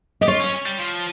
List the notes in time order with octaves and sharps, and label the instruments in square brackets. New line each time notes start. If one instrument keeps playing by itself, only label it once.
[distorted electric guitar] G4 [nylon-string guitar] D#5
[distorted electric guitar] F4 [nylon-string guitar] C#5
[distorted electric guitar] C#4
G3
F3